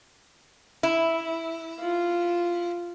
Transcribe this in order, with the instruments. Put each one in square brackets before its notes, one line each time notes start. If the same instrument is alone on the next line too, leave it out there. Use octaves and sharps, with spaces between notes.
[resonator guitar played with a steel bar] E4
[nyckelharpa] F4